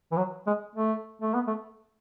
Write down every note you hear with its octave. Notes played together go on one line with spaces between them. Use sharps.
E3
F#3
G#3
A3
A3
B3
A3